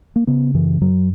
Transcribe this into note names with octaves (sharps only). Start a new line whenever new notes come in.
A#3
C#3 B3
F#2 E3
F#2 F#3